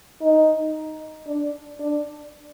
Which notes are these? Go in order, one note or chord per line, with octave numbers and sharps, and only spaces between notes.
D#4
D4
D4